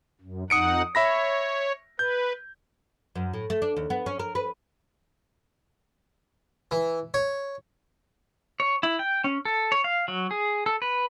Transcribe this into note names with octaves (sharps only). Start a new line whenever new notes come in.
F#2
F2 D#4 F#5 D#6 C#7 D7
C#5 E5 B5 A#6
B4 G6
F#2
A2
A3
D4
D#2
B3
C#4
A#4
B4
E3
C#5
C#5
E4
G5
C#4
A4
C#5
F5
F#3
G#4
A4
B4